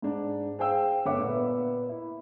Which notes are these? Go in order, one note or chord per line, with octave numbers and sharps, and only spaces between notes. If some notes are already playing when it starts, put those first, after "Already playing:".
G#2 D4
G#4 C5 F5 G5 E6
G1 C#5 E5 F#5 D6
A#2 B3
E4